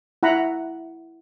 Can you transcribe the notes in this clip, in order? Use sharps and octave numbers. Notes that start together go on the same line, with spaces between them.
E4 F#5 A#5 B5